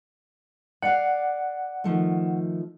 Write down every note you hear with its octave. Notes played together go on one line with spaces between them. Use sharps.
D5 F5 F#5
D#3 F3 A3